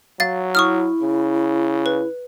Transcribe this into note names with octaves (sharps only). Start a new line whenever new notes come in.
F#3 F5 A6
E4 C#6 D#6 F6
C#3
B4